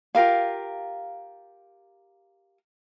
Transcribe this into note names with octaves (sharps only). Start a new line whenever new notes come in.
F4 G4 A#4 F5